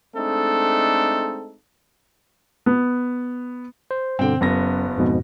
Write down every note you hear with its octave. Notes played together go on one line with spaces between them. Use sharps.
G#3 A3 C4 D4 D#4 A4
B3
C5
G2 B2 D3 C4 G5
F#1 F#2 B3 A#6
F2 G#2 B2